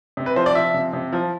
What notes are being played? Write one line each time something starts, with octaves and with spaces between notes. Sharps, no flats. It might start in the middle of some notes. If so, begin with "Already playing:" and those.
C3
B4
F3 C5
D5
F3 E5
C3
C3
F3